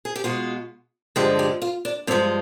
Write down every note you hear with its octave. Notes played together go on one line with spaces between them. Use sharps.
G#4
G4
B2 G#3 F4
G2 D3 F3 G#3 G4
G4
F4
D4
G2 F3 G#3 C4